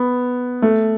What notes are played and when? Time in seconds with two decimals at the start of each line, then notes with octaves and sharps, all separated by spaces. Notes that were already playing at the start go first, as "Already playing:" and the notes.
Already playing: B3
0.62 A3